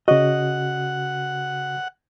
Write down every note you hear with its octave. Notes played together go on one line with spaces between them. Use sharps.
C#3 F#4 D#5 F#5